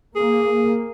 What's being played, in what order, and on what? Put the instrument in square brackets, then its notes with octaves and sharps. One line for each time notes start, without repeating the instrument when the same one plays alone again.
[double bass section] A#3 [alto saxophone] G#4